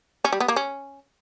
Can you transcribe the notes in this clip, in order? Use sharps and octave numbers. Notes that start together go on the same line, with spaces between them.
C#4
G3
B3
A#3
C#4